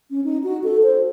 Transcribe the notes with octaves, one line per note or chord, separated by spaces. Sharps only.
C#4
D#4
F#4
A4
C5